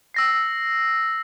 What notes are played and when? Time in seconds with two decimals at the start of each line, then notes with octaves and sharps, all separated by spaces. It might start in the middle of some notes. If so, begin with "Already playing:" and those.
0.14 E6 A#6 C7